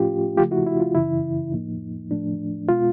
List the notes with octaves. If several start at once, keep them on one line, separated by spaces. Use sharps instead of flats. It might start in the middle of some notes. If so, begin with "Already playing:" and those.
Already playing: A2 F3 A3 C#4 F4 G4
C#3 F3 A3 F4 G4
E4 F#4
E4
F4
F#2 C#3 E3 E4
A2 F3 A#3 D#4
A2 F3 A3 D4
B2 G#3 B3 F4